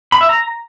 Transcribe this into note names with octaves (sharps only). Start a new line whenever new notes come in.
B5
E5
A#5